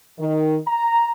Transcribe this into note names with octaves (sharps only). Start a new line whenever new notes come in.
D#3
A#5